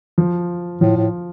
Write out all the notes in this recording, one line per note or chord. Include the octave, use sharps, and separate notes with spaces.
F3
A2 F3
A2